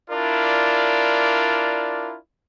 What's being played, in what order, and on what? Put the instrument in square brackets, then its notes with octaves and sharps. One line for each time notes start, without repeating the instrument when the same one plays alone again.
[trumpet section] D4 E4 F4 A#4 D5